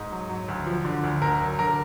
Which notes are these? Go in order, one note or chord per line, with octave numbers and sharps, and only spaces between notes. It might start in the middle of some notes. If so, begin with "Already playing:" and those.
Already playing: G#2
F#3
F#3
D2
F3
D3
D2
D2 A#4
F#3
D3 A#4